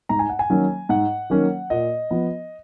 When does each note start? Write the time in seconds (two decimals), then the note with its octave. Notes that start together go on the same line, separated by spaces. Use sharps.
0.09 G#2 A#5
0.19 G#5
0.29 F#5
0.39 G#5
0.50 D#3 F#3 A#3 C#4
0.89 G#2 F#5
1.30 D#3 F#3 A#3 C#4
1.70 A#2 D#5
2.11 F3 B3